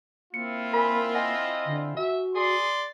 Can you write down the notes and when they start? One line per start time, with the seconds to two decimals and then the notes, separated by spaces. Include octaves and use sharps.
0.34 A#3 C4 E4 F4 C#7
0.73 A#4 G#5 B5
1.15 D#5 F#5 G#5
1.66 D3
1.97 F#4 E5
2.35 G#4 D5 C6